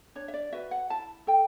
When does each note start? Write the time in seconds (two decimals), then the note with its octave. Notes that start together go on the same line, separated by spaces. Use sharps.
0.15 D4 C#5
0.28 E5
0.34 D5
0.53 F#4 B4 E5
0.71 F#5
0.90 E4 A5
1.27 A4 G5